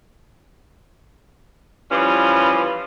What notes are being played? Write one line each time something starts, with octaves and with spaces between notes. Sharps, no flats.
E3 F3 G3 C#4